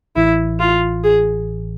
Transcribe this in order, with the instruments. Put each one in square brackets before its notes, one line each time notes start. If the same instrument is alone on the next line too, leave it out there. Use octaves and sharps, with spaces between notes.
[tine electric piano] A1 A2 E3 [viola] E4
[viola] F4
G#4